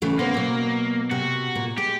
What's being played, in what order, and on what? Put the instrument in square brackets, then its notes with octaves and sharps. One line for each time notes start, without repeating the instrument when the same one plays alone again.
[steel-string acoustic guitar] C#3 E3 A3
[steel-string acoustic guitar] C#3 B3 C5 [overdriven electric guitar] A#3
[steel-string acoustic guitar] B2 F#3
[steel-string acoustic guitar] C3 [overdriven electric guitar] F#4
[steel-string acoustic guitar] A#2
[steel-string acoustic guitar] G#3 [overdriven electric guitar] G4